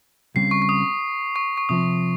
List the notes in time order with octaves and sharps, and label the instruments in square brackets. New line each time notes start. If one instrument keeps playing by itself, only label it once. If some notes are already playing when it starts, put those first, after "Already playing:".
[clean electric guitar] C#2 C#3 G3 C4 [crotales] C7
[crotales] C#6
C#6
D#6
C#6
C#6
[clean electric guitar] C3 F3 C4 [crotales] D#6